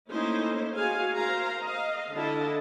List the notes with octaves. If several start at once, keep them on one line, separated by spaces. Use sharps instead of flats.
A3 A#3 C#4 D#4 E4 C5
F#4 G#4 F5 G#5
A#4 C5 F5 A#5
D#5 F5
D3 E4 A4 D#5 A5